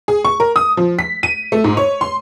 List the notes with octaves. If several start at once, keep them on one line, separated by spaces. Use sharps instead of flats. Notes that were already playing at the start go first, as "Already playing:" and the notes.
G#4
C#6
A#4
D#6
F3
B6
D#7
A3
G#2
C#5
C6